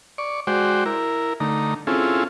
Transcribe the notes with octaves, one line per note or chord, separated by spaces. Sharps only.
D5 C#6
G#3 F#4 C5 D5 G5
E4 A#4
D3 A3 D#4 A#5
C4 C#4 E4 F4 G#4 A4